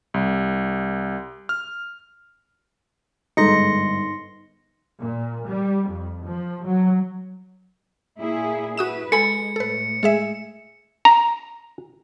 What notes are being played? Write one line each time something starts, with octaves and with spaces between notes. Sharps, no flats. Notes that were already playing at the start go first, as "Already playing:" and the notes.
C2
F6
G1 G#2 D#4 A4 C6 A#6 C#7
A#2
G3
F2
F3
F#3
A#2 E4 G#4
E4 F#4 B4 D#6 E7
G#3 A4 G#5 B5 C#7
A2 A4 B4
G#3 G#4 E5
A#5